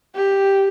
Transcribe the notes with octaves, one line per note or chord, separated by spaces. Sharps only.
G4